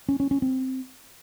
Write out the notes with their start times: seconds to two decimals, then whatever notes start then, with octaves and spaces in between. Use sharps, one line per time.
0.09 C#4
0.20 C#4
0.31 C#4
0.42 C4